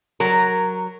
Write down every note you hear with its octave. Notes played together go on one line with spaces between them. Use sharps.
F#3 A#4